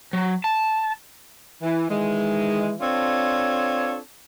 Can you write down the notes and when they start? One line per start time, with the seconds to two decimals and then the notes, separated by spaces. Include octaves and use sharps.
0.13 F#3
0.44 A5
1.62 E3
1.89 D#3 E3 G#3
2.80 C4 D4 F4 A4 C#5